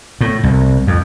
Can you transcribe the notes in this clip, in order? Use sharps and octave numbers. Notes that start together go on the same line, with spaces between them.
A2
C2
F2